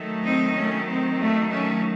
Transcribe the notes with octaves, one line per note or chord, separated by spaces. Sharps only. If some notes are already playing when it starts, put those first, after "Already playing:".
Already playing: D#3 F#3 A3
C4 D#4
A3 C#4
C4
A3
A3 C#4